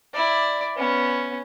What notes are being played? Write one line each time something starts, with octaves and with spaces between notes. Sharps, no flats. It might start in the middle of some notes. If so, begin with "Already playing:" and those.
E4 D5
B3 C#4